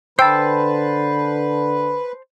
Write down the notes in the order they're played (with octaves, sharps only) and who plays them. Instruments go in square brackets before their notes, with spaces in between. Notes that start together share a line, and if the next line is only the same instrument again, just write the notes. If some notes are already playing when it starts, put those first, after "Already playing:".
[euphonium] D3 [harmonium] B4 [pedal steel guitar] C5 A5 [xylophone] G5 E6